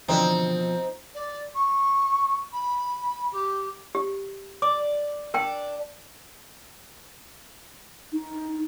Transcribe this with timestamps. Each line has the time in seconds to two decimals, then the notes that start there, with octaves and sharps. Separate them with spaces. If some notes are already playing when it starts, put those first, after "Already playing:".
0.08 B2 D3 E3 F3 C4 D#4
1.14 D5
1.55 C#6
2.52 B5
3.32 G4
3.95 G4
4.62 D5 D6
5.34 D4 A#4 G5
8.13 D#4